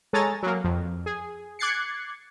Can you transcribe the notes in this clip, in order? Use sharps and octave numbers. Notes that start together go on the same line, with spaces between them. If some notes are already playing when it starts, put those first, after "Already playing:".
G#3 A4 C#5 G#5 A#5 A6
F#3 A#3
F2
G#4
D6 F#6 G#6 A6 C7 C#7